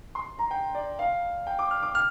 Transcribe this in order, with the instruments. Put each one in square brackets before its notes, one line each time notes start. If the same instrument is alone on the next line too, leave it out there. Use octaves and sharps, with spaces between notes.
[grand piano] C6
A#5
G5
D5
F5
G5
D6
F6
D6
F6